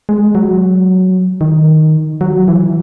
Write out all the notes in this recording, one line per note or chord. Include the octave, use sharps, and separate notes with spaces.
G#3
F#3
D#3
F#3
E3